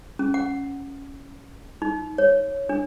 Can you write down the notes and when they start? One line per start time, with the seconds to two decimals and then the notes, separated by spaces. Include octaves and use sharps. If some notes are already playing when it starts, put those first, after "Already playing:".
0.19 C#4
0.34 F#5
1.82 D#4
2.18 C#5
2.69 D4